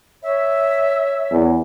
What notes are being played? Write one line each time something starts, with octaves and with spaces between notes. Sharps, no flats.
C#5 E5
E2